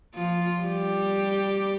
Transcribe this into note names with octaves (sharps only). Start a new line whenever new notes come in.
F3 F4
G3 G4